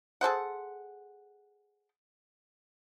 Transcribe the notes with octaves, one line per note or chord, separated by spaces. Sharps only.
G#4 A4 C5 F#5